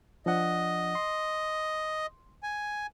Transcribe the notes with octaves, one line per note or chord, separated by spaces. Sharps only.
F3 D4 D#5 F#5
C6
G#5